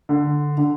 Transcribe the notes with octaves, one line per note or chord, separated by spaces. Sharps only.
D3
D3